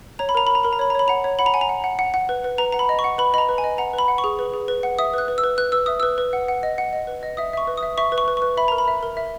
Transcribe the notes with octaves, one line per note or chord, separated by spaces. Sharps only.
C#5 A#5
B5
A#4 A#5
A#4 B5
A#5
A#4 B5
A#5
C#5 B5
A#5
C#5 B5
F#5 A#5
C#5
F#5 B5
A#5
F#5 G#5
A#5
F#5
F#5
F#5
F#5
B4
B4
B4 A#5
F#5 A#5
B5
D#5
C#6
F#5
B4 B5
D#5 A#5 B5
B4
G#5
D#5
F#5 A#5
B4
B5
F#5
C#6
G#4
B4
G#4
B4
F#5
E5 D#6
B4 F#6
B4
E6
B4
B4 F#6
B4 E6
E5 D#6
B4 E6
B4
F#5
F#5
D#5
F#5
D#5
B4
D#5
E5 D#6
E5 C#6
B4
D#6
E5
E5 C#6
B4
C#6
B4
C#6
B4
E5 B5
A#4 A#5
B5
E5
A#4
E5